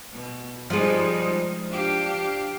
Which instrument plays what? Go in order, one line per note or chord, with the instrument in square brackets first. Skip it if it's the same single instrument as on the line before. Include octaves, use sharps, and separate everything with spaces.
[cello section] B2
[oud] F3 G#4 [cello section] G3 G#3 D#4
[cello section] D4 G4 F5